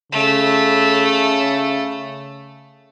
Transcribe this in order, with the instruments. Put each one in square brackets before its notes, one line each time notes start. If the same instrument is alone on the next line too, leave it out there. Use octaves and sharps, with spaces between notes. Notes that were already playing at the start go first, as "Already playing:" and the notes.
[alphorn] C#3 [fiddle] A3